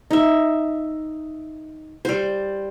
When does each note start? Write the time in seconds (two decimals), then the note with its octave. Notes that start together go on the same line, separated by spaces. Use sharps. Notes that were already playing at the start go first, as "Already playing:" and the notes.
0.11 D#4 E5
2.05 G3 C5